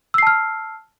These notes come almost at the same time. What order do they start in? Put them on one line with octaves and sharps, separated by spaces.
E6 C7 A5 F6